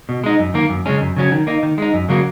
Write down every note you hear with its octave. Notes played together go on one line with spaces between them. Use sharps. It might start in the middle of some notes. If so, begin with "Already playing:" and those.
B2
G#3 D#4
F#2
D#3 A#3
F#2
C#3 G#3 C#4
F#2
C#3 F#3 C#4
D#3
A#3 D#4
D#3
G#3 D#4
F#2
C#3 F#3 A#3